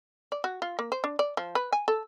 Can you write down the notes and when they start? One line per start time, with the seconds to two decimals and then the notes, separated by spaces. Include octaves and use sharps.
0.32 D5
0.44 F#4
0.62 F4
0.79 A#3
0.92 C5
1.04 D4
1.19 D5
1.37 F3
1.55 B4
1.73 G#5
1.88 A4